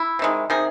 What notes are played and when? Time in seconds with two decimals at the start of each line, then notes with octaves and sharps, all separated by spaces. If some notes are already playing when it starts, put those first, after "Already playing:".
Already playing: E4
0.19 C3 D#3 G#3
0.50 C3 D#3 G#4